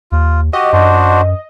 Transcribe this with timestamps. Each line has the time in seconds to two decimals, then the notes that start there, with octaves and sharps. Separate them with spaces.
0.12 D#2 F4
0.53 F#4 G4 D#5
0.73 F#2 D4 F#4 C5